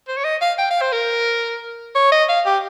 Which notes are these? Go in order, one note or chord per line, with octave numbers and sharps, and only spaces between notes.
C5
C#5
D#5
F5
G5
F5
C5
A#4
C#5
D#5
F5
G4